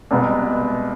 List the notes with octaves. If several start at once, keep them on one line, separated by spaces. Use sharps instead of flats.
C2 B2 G#3 B3